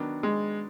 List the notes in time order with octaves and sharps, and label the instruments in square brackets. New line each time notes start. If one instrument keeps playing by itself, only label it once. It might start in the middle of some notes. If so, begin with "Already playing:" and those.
Already playing: [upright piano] D#3 F#3 B3 D4
[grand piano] G#3